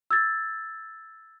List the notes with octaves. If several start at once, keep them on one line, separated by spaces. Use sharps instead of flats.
E6 G#6 A6